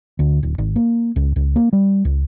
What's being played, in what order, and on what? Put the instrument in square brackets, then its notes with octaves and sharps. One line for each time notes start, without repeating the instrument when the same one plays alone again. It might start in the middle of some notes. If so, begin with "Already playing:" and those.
[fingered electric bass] D2
D1
G#1
A#3
C#2
C#2
A#3
G3
C#2